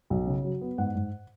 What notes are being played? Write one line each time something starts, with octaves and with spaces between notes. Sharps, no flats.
B1
C#3
F#3
B3
G#2 F#5
G#2